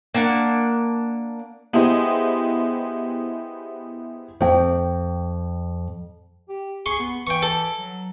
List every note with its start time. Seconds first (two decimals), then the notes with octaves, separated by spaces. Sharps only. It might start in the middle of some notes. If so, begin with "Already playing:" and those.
0.14 A#3 D4 F#5
1.73 B3 E4 G4 G#4 C5 D#5
4.41 F2 G5
6.49 G4
6.86 G#4 C6 C#6
6.99 B3
7.27 E3 G5 C#6
7.42 A4
7.78 F#3